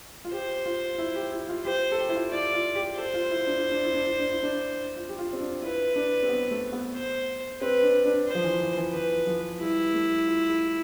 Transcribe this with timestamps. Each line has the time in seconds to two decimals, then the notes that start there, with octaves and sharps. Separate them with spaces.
0.25 F4
0.32 G4 C5
0.66 F4
0.98 E4
1.15 G4
1.32 E4
1.49 F4
1.65 G4 C5
1.92 A4
1.98 G4
2.09 E4
2.15 F4
2.31 E4 D5
2.54 F4
2.75 G4
2.98 A4 C5
3.14 F4
3.31 E4
3.47 D4
3.59 E4
3.71 D4
3.83 E4
3.94 D4
4.07 E4
4.19 D4
4.31 E4
4.43 D4
4.96 F4
5.09 G4
5.19 F4
5.33 C4
5.41 D4
5.62 E4 B4
5.96 D4
6.23 C4
6.29 B3
6.51 A3
6.72 B3
6.96 C5
7.61 C4 B4
7.83 D4
8.05 D4
8.28 C5
8.35 F3
8.44 E3
8.61 E3
8.77 E3
8.93 E3 B4
9.27 F3
9.60 G3 E4
9.94 A3
10.27 F4
10.48 A4